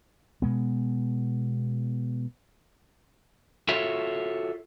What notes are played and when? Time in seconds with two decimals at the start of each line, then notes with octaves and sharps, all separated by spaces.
0.42 B2 G#3 B3
3.68 F4 F#4 A4 C#5 E5